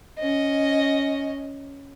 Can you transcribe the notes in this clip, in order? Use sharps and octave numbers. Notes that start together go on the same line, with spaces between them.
C#4 D#5